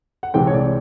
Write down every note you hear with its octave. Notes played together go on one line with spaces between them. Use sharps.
F#5
C2 C3 E3 G#3 C4 G5
C#5
D5